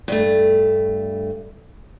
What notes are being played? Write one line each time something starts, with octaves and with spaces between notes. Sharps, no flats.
G2 A3